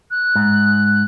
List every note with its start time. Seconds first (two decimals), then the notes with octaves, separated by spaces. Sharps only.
0.11 F#6
0.35 G#2